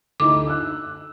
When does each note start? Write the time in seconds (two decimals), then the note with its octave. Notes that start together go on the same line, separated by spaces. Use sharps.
0.20 D2 D#4 E4 D6
0.47 E6 F#6